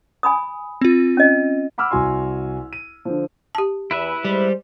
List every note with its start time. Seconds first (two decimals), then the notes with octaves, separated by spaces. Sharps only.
0.23 G#5 B5 D#6
0.81 C4 F4
1.17 C#4 D#5
1.78 F#5 B5 D6 E6 F6
1.91 C2 F#4 G#5 C6
2.73 D#7
3.05 D3 F3
3.55 G4 A5
3.91 E2 E4 B4 E5
4.25 G3 G#3 C5